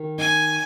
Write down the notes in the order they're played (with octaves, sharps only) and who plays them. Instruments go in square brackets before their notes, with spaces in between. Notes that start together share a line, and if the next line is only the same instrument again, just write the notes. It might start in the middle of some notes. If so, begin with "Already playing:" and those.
Already playing: [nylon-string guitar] D#3
[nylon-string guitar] D#4 [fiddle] G#5